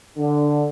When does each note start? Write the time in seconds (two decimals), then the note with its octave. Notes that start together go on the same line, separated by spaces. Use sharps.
0.18 D3